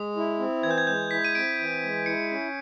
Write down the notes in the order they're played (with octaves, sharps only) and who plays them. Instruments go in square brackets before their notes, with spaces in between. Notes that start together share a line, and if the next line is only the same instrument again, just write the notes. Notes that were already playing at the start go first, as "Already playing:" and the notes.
Already playing: [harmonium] G#3 [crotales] D#6
[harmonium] E4
C4
[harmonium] E3 [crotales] G#6
[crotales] G6
G#6
[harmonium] G#3 [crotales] G6
[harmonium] E4 [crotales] B6
[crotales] D#7
[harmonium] C4 [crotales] D7
[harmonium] E3
G#3
[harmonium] E4 [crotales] C#7
[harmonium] C#4